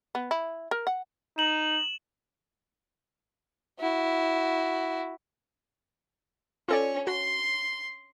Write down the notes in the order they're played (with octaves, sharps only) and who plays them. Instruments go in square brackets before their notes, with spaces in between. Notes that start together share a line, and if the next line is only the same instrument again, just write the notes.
[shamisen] B3
E4
A#4
F#5
[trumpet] D#4 [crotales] E7 F#7
[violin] E4 F#4
[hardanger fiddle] C#4 C#5 [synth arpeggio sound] F4 A4 D5
[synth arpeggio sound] F#4 [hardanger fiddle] C6